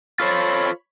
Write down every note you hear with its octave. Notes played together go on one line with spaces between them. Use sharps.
F4 A4 C5 C#5 B5